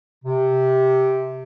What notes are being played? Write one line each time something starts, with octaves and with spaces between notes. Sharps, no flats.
C3